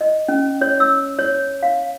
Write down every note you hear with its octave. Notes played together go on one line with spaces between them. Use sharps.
D#5
C#4
C#5
E6
C#5
F5